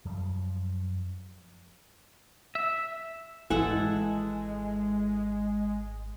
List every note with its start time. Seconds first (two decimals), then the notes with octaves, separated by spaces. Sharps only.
0.05 F#2 F3 G3
2.55 E5
3.50 G#1 E3 G#3 A4 F#5 G#5